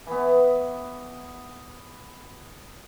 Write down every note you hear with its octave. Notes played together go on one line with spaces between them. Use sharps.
E3 B3